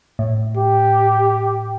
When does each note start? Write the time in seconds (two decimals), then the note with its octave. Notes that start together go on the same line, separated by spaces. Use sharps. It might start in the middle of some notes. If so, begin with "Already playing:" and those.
0.19 A2
0.57 G4